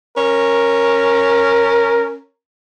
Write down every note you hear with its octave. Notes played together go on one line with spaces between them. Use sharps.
C#4 A#4